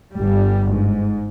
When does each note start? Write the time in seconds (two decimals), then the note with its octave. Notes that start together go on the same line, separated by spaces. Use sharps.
0.15 G1 G3
0.73 G#2